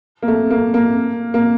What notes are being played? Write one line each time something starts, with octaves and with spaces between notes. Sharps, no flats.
A#3
A3
A#3
A#3
A#3